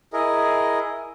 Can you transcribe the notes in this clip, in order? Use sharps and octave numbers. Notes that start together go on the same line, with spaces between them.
E4 G#4 A#4 D#5